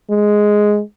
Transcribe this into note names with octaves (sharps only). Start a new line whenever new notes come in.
G#3